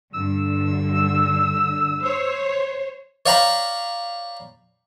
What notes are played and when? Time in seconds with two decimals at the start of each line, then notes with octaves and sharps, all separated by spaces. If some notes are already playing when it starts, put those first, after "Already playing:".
0.14 G2 D3 E6
2.01 C5 C#5
3.26 C#5 D5 F5 G5 A#5 B5